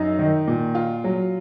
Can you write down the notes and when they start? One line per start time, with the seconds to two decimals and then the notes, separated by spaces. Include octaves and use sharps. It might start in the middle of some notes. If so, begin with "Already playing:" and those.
Already playing: F#2 D#4
0.19 D#3
0.47 A#2
0.75 F4
1.04 F#3